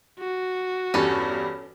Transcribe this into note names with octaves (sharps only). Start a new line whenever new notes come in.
F#4
E2 G2 G3 C#4 A4